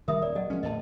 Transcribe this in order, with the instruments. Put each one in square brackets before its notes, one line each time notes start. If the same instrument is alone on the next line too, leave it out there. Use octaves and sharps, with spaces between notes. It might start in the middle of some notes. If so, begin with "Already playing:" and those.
[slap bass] D#3 G3 [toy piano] A#4 E5 D#6
[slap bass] D#1 [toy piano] D5 D#6
[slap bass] F#3 [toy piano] D#5 F#5 G#5
[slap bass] F3 G#3 C#4
[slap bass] E2 A2 D3 [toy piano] D#5 A5